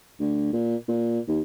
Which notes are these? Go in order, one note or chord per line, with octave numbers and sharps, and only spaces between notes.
D2
A#2
A#2
D#2